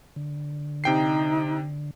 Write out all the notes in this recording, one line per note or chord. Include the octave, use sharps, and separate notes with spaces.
D3
C3 D#4 G5 C7